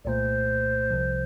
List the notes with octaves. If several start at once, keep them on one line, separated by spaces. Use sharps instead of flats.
C2 A#2 A3 C5 D5
C2 C3 F3